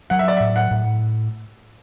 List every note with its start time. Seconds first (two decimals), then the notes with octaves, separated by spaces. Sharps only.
0.10 F#3 F#5
0.19 E5
0.28 D5
0.37 E5
0.40 A2
0.56 F#5
0.71 A2